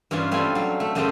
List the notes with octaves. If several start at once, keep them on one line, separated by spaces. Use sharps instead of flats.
G2 E3 C#4 F4 C5
G3 A3 C4 F4 D5 G#5
F#3 F5
A3
F#2 C#3 A3 G4 C5 G5